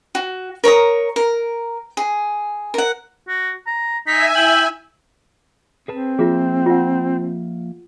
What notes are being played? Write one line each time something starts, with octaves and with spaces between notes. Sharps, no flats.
F#4
A#4 C#5 A#5 D#6
A#4
G#4
A#4 F#5
F#4
A#5
D#4 E5 G#5 B6
E4 G5 F#7
C4 G#4 B4 A5
F3 A#3 F4 G#4 E5
F4 F#5